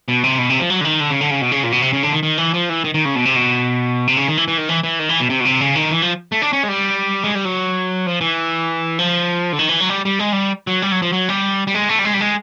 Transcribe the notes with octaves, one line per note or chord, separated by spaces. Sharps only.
B2
C3
B2
C3
F3
F#3
D3
D#3
D3
C#3
D3
C#3
B2
C#3
A#2
B2
C3
C#3
D3
D#3
D#3
E3
F3
E3
D#3
D#3
C#3
B2
C3
B2
C3
C#3
D#3
E3
E3
D#3
E3
E3
D#3
E3
B2
C3
B2
C3
C#3
D#3
E3
F3
A3
D4
C#4
G#3
G3
G#3
G3
F#3
F3
E3
F3
D3
D#3
E3
F#3
G3
G3
G#3
G3
F#3
G3
F#3
F3
F#3
G3
G3
G#3
A3
G3
G#3
G3
G#3